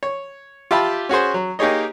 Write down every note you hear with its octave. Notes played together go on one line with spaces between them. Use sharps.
C#5
F4 G4 E5 A5 B5
C#4 F#4 G#4 C5
F#3
A#3 D#4 G4 G#4 C#5 D#5